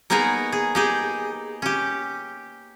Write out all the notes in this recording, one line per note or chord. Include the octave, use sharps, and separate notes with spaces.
A#3 B3 D#4 G#4 A#4 C#5
G#4
D#4 G4 G#4
C#4 G4